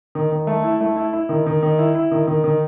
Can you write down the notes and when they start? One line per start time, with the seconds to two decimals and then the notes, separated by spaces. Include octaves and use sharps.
0.15 D#3
0.32 D#3
0.47 A3
0.63 E4
0.81 A3
0.96 E4
1.13 E4
1.29 D#3
1.46 D#3
1.63 D#3
1.78 E4
1.95 E4
2.11 D#3
2.28 D#3
2.44 D#3